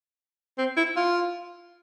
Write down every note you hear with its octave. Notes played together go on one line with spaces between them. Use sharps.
C4
E4
F4